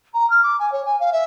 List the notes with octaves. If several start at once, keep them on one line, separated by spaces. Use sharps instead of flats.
A#5
F6
D6
G#5
C#5
G#5
F5
E5